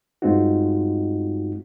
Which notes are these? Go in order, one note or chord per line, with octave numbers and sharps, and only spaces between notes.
G2 G#3 C4 D#4 F4 F#4